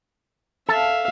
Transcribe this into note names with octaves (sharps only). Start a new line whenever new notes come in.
A4 E5 F5 A5